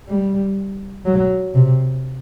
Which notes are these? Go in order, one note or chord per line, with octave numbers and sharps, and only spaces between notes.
G3
F#3
C3